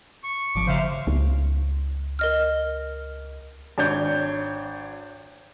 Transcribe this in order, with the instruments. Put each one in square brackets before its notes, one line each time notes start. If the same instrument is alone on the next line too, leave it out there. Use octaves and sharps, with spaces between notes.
[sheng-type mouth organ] C#6
[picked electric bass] G#1 F3 [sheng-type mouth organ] C#6 D6
[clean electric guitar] C#3 E5 [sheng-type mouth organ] C5 F5
[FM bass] C#2
[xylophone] A#4 D#5 F6
[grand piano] G#1 D4 C#5 G6